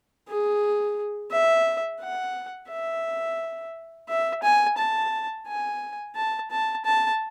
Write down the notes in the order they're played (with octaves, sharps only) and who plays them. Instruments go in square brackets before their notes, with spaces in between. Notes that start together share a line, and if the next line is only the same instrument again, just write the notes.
[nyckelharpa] G#4
E5
F#5
E5
E5
G#5
A5
G#5
A5
A5
A5